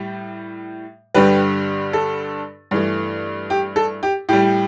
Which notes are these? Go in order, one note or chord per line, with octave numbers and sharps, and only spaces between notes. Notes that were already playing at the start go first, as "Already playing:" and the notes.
Already playing: A2 G3
G2 D3 G3 G4 B4
A4
G2 E3 A3
G4
A4
G4
A2 G3 G4